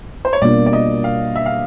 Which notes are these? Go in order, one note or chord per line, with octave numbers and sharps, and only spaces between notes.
C5
C#5
B2 G3 A#3 D4 F4 D5
D5
D#5
F5
E5
F5